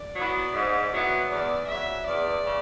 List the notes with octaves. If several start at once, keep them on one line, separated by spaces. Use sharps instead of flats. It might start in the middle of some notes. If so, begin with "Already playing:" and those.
Already playing: D5
F#3 B3 E4
G#2
F#3 B3 E4
E2 D5
C#3 F#3 E5
E2 D5
C#3